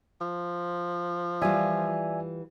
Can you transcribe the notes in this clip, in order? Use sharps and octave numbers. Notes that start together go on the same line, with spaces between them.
F3
E3 G3 F4 D5 E5 G#5